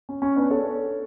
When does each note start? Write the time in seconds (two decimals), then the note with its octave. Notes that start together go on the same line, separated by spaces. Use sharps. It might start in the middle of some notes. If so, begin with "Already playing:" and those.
0.09 C#4
0.22 C#4
0.36 B3 D4
0.50 A4 C#5